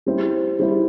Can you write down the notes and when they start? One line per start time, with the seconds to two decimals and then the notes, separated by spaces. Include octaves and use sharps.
0.06 G3 C4 E4
0.59 G3 C4 E4